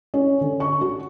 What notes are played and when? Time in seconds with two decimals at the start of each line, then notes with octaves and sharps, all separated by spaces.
0.14 C#4
0.41 D3
0.60 C#6
0.81 F#4